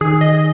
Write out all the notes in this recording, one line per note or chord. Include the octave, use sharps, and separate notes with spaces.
D#3 G#4
D#5